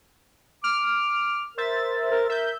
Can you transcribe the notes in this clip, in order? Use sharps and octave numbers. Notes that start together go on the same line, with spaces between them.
D6 F6
A#4 C5 E5 A6
A#4
A#4 E5 G6